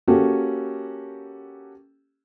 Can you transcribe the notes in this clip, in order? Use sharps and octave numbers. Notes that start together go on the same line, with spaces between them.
A#3 C#4 F#4 G4 A4